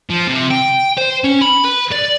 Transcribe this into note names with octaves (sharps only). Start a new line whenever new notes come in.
F3
C3
G5
C5
C#4
B5
B4
D5